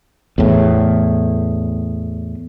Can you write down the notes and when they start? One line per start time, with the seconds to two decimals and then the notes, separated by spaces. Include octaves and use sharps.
0.38 E2 A2